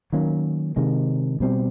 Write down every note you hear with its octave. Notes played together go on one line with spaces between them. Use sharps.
D#3 F#3 A#3 C#4
C3 D#3 G#3
B2 G3 C4